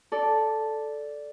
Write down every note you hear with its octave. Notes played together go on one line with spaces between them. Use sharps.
A4 D5